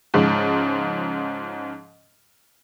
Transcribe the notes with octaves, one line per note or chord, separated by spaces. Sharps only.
G#2 C#3 F3